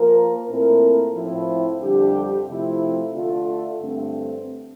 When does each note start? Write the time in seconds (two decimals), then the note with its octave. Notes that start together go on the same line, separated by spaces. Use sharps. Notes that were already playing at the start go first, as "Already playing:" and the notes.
Already playing: F3 A#3 F4 A#4
0.46 A#2 A3 C4 E4 A#4
1.13 A2 F3 C4 E4
1.80 F2 D3 G3 D4 G4
2.47 C3 F3 A3 C4 E4
3.14 D3 A3 D4 F4
3.81 G2 D3 A3 C4